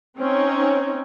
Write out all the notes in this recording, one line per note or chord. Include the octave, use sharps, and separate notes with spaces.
C4 C#4 D#4